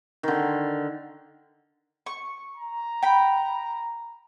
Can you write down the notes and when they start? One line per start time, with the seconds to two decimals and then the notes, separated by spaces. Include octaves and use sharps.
0.23 D3 D#3
2.06 C#6
2.55 A#5
3.03 G5 B5